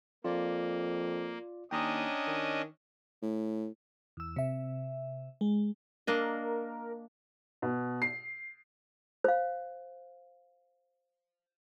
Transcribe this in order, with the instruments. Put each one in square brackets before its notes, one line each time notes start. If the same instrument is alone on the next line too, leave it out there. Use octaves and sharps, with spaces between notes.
[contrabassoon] F2 [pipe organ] A#3 [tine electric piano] F4 D5
[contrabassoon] D#2 [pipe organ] C#4 D4 D#5 [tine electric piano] G5 A#5 D#6
[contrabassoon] D#3
A2
[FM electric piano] E2 E6
C3 E5
G#3
[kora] A#3 D4 D#5 [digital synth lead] A#4
[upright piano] B2
C7
[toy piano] C5 F5